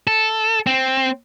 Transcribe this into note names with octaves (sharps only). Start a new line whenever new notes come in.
A4
C4